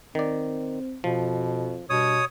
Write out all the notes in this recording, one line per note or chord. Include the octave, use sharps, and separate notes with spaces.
D#3 C4 D5
F2 B2 F3
G2 B2 C#5 D#6